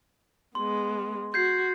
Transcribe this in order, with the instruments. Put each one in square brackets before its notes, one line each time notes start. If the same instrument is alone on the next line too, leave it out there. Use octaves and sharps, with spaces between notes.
[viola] G#3 B3 [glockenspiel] C6
[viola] F#4 [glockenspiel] G6 G#6 C7